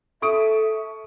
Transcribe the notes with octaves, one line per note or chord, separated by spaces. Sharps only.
A4 E5 C#6 D#6 D7